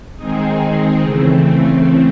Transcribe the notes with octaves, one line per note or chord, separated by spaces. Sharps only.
D#3 G#3 C4 D#4 G#4
C#3 E3 A3 C4